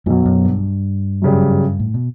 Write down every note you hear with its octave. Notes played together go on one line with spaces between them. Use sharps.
B1 F#2 B2 F#3
F#2
G2
F#2 C#3 G3
A2
B2